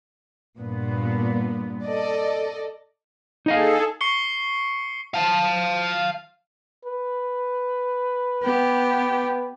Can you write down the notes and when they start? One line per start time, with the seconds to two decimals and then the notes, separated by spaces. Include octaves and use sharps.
0.60 G2 A#2 B3
1.86 A4 D5 D#5
3.46 D#4 G#4 A4 D#5 F5
4.01 C#6 C7 C#7 G7
5.14 F5 A5
6.85 B4
8.42 B3 G4